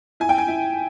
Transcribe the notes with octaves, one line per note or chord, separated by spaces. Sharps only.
E4 G#5
G5
G#5
E4